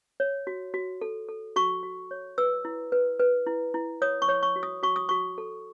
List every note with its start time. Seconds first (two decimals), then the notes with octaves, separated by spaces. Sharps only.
0.20 C#5
0.47 F#4
0.74 F#4
1.01 A4
1.29 A4
1.56 F#4 C#6
1.83 F#4
2.11 C#5
2.38 B4 E6
2.65 E4
2.92 B4
3.20 B4
3.47 E4
3.74 E4
4.02 C#5 D#6
4.22 C#6
4.29 C#5
4.43 C#6
4.56 F#4
4.63 D#6
4.83 F#4 C#6
4.96 D#6
5.09 F#4 C#6
5.38 A4